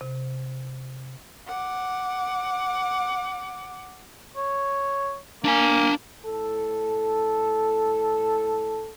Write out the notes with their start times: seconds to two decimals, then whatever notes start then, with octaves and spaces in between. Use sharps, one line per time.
0.01 C3
1.46 F#5 D6
4.37 C#5
5.44 A#3 D4 G#5
6.26 A2 A4